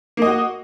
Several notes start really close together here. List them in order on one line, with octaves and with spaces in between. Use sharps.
A#3 D#5 F#4